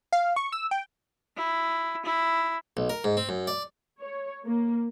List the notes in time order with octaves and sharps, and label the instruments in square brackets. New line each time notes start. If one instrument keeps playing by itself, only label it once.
[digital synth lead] F5
C#6
E6
G5
[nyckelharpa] E4
E4
[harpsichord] B1
A#4
G#2
C4
F#2
D5
[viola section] C#5
A#3